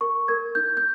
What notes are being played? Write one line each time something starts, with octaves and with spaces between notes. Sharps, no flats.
A#4 C#6
A#4 G#6
D#4 G6
G6